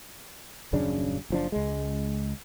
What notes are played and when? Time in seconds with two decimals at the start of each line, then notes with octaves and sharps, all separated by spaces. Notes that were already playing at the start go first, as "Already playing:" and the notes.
0.73 D#1 F#2 C#3 D4
1.30 F#1 F3 D4
1.52 C#2 G#3